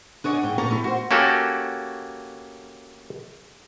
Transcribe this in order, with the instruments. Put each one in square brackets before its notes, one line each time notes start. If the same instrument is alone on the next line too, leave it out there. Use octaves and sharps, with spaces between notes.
[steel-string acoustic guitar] D4 G#4 C#5 D#5 F#5
G#2 G5
A#2 C#4 A4 C#5 D5 A#5
A3 E4 G4
F#4 C5
[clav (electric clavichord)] A#3 C#4 F#4 G4 A4